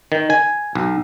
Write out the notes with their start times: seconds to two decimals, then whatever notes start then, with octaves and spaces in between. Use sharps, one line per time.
0.12 D#3
0.30 G#5
0.75 B1